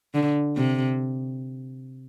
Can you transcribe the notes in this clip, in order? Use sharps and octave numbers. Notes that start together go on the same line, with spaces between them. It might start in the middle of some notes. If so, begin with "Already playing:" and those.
D3
C3